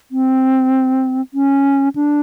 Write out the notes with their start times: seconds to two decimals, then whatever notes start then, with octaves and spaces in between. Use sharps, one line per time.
0.11 C4
1.34 C#4
1.95 D4